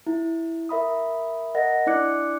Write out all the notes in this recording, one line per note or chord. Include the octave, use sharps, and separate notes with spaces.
E4
A#4 E5 B5 D#6
A#4 D#5 F#5 A#6
D4 E4 D5 D6 F#6 C#7